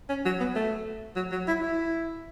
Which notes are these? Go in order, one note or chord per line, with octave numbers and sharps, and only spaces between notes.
C#4
F#3
B3
A3
F#3
F#3
E4
E4